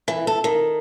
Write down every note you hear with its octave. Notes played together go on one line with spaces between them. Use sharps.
E3
A4
D#3